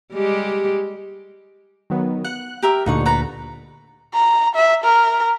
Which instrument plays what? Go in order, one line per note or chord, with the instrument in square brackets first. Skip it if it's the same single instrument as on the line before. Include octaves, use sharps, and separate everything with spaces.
[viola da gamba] G3 G#3 G4
[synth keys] D#3 F#3 B3
[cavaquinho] F#5 [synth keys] F#6
[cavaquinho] G4 A#4 E5
[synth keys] D2 A#2 D3 [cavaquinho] D#4 F#5 C#6
[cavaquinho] A4 B4 A#5
[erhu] A#5
E5
A#4